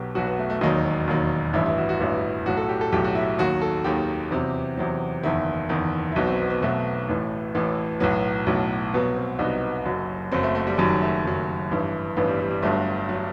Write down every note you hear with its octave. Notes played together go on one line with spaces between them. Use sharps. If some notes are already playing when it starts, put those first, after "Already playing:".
Already playing: B1 B2 F#3 G4
B1 B2 F#3 F#4
B3
A3
A3
E1 D#2 D#3 F#3 D#4
E1 D#2 D#3 F#3
A1 G2 E3 E4
E4
F#4
F#4
A1 G2 E3 E4
B1 A2 F#3 F#4
A4
G4
A4
B1 A2 F#3 G4
F#4
E4
D#2 D#3 F#3 F#4
A4
D#2 D#3 F#3 G4
E2 C3 F#3
E2 C3 F#3
F#1 E2 D#3 E4
F#1 E2 D#3
E4
B1 B2 F#3 D#4
C4
B3
B3
B1 B2 F#3 A3
A1 A2 E3
A1 A2 E3
B1 A2 F#3 B3
B1 A2 F#3
C2 B2 F#3 B3
C4
C2 B2 F#3 D#4
F#1 F#2 F#3
F#1 F#2 F#3 C4
A3
A3
G3
F#1 F#2 D#3 F#3 G3
A3
F#1 F#2 D#3 F#3
A1 G2 E3
A1 G2 E3 B3
G3
G3
G3
G1 G2 F#3 A3
F#3